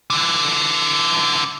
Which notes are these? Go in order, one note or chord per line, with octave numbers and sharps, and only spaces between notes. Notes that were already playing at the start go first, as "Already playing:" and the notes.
D3 E3